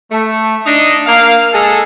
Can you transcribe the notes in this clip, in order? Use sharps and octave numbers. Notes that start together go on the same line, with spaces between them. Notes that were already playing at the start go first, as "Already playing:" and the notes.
A3
D4 D#4 D#5
A#3 F5
G#3 G#4 A4